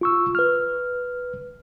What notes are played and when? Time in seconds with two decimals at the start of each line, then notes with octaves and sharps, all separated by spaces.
0.01 F4 C#6 E6
0.35 B4 F6